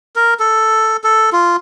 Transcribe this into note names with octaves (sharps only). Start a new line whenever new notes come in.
A#4
A4
A4
F4